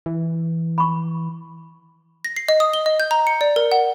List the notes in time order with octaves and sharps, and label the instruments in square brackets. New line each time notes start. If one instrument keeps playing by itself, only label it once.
[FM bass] E3
[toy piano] B5 C#6
[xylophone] A#6
C7
D#5
D#6
G7
D#5
G6
A#5
C#7
D5
A#4
F#5